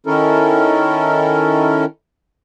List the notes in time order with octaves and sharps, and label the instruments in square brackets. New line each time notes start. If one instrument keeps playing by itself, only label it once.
[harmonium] D#3 C#4 E4 A4 A#4